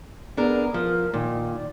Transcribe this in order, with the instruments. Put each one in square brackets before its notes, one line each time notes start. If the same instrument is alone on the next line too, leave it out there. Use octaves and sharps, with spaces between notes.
[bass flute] B3 [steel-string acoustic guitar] D4 G#4 A#4
[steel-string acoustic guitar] F3 [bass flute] A#4
[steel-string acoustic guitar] A#2 [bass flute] D#3
[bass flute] D5